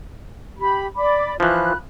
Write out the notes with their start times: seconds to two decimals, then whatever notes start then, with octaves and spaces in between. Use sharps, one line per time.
0.59 G4 B5
0.97 D5 B5 D6
1.40 E3 F3 F4 B5 F#6